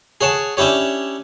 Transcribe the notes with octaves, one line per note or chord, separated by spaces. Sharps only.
G#4 C#5 F#5 A5
C#4 D4 E4 G4 C#5